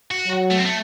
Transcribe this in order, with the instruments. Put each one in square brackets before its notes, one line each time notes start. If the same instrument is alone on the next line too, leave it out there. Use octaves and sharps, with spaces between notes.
[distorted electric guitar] F#4
[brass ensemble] F#3
[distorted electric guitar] A3
C4
A3